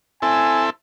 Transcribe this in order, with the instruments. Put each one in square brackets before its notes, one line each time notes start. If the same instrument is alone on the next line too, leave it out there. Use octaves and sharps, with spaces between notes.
[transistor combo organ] C4 E4 A4 [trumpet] G#5